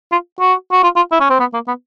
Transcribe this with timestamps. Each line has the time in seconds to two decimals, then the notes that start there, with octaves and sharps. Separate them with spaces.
0.12 F4
0.40 F#4
0.72 F#4
0.83 F4
0.96 F4
1.12 E4
1.20 C#4
1.30 C4
1.40 B3
1.54 A#3
1.67 B3